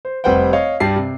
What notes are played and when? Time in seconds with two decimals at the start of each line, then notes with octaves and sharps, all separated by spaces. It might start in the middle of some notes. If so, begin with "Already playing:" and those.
0.05 C5
0.24 F1 G3 B4 C5 F#5 G5
0.53 C#5 D#5 F5
0.80 G2 G3 A5 C7
0.96 C3